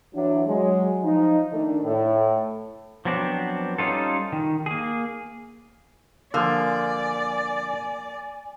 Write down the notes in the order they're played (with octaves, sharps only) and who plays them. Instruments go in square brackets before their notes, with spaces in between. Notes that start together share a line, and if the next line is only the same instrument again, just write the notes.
[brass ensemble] E3 F#3 D4 E4
F#3 G#3
F3 D#4
D#3 A3 D4
A2
[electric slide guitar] F3 F#3 B3 C4 D4
G3 C#4 D#4 F4 A4
D#3
A#3 G#4
[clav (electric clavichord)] D3 F3 [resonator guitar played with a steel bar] A#3 [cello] D5 [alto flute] G#5